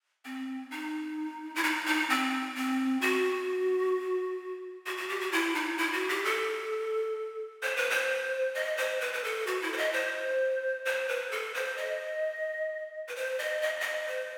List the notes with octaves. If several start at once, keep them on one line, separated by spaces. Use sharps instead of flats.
C4
D#4
E4
D#4
D#4
C4
C4
F#4
F#4
F#4
G4
F#4
E4
D#4
E4
F#4
G4
A4
C5
B4
C5
D#5
C5
B4
B4
A4
F#4
E4
C5
D#5
C5
C5
B4
A4
C5
D#5
B4
C5
D#5
D#5
D#5
C5